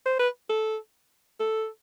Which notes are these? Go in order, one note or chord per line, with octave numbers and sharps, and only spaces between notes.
C5
B4
A4
A4